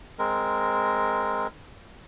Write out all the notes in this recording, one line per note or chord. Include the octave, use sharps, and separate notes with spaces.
G#3 C4 A#4